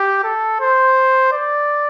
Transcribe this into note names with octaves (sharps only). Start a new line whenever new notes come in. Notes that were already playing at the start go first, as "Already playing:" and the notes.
Already playing: G4
A4
C5
D5